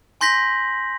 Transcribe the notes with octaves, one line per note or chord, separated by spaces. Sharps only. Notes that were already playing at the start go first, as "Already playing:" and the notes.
G#5 C6 G6 A#6 B6 F#7